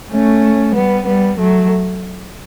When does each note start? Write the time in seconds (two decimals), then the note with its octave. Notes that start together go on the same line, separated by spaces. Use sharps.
0.11 A3 C#4
0.75 G3 B3
1.07 G3 B3
1.38 F#3 A3